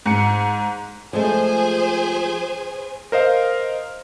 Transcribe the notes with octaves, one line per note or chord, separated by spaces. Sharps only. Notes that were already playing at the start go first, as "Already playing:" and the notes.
G#2 C#7
F3 G#3 A3 G#4 C5 G#5
A#4 C5 D#5 F5